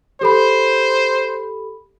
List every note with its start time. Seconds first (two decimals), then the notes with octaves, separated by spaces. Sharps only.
0.21 G4 A4 C5 B5